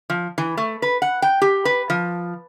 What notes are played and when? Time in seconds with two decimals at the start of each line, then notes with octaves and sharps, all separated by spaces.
0.10 F3
0.38 E3
0.57 A3
0.82 B4
1.02 F#5
1.22 G5
1.42 G4
1.65 B4
1.90 F3